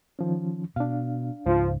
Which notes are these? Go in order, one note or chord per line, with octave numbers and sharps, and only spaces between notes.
D#3 F3 C#4
B2 D4 F5
C#2 G#2 F3